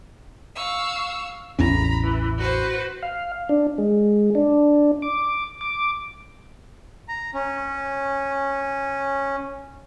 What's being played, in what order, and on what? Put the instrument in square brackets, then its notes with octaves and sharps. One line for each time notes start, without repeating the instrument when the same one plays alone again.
[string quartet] F5 C#6 E6
[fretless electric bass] A1 E2 C#4 [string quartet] A#5 B5
[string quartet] E3
F#4 B4 C5
[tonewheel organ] F5
D4
G#3
D4
D6
D6
[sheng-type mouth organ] A#5
C#4